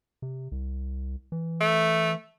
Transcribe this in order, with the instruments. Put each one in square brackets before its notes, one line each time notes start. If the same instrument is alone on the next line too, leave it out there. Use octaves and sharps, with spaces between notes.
[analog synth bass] C3
C2
E3
[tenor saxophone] A3